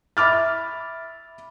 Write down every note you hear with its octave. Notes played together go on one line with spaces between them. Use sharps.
E5 B5 D6 F6 A6